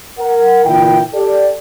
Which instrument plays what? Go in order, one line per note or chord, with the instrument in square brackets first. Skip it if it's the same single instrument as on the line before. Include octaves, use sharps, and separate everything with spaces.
[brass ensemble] A#4 F#5
A#2 D3 E3 E4 G5
G4 A4 D5